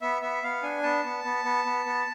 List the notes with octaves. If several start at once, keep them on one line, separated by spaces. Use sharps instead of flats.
B3 E5
B3 E5
B3 F5
D4 G#5
B3 A5
B3
B3
B3
B3
B3